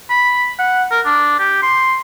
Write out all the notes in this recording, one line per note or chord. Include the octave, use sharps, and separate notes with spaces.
B5
F#5
A#4
D4
G4
C6